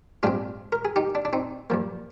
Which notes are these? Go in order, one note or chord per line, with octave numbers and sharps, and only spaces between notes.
G#2 G3 C4 D4 F4
A#4
G#4
D#4 G4
D4
D4
C4 D#4
G2 F3 A#3